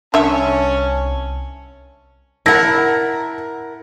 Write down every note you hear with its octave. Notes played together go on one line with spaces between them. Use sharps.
C2 C#4 D4 E5 A5
E4 A#4 F#5 A5 A#6